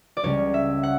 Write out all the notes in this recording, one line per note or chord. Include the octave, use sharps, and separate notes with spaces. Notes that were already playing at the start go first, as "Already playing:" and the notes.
D5
C#2 C#3 G3 C#4 C#5
E5
F#5